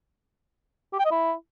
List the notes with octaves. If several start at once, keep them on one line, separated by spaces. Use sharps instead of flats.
G4
G5
D#5
E4